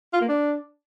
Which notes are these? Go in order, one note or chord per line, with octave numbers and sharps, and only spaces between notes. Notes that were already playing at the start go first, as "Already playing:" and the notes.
F4
A#3
D4